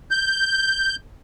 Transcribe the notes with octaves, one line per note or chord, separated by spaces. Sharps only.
G6